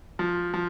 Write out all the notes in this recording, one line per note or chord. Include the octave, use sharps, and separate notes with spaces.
F3
F3